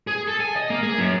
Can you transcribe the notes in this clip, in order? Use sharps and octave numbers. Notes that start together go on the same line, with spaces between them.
G#4
A4
G#5
D#5
A#3
G#4
F#2